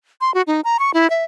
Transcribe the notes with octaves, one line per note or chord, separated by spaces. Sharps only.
C6
F#4
D#4
A#5
C#6
E4
E5